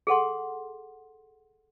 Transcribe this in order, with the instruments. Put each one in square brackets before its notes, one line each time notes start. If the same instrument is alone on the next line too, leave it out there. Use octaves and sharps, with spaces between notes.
[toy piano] G#4 A4 F#5 C6